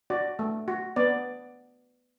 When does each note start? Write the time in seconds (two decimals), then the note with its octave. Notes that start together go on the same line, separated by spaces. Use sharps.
0.10 F#4 D5
0.39 A3
0.68 F#4
0.96 B3 D5